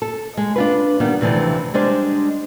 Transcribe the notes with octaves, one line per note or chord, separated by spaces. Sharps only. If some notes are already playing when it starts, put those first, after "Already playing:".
A4
G#3
D4 F4 B4
D#3 G3 B3
D2 C3 E3 F3 A3 D4
G3 G#3 D4 C5